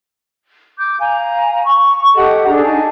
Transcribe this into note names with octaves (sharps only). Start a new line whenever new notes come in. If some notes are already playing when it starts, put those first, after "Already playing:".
D6 G6
F5 G#5 A#5
C#6
G4 A4 D#5 F#5
D4 G#4 A4 A#5
D#4 G#5 A5